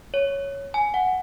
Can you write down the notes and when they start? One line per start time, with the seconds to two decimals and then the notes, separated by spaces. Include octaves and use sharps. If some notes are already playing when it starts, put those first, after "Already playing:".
0.14 C#5
0.74 G#5
0.94 F#5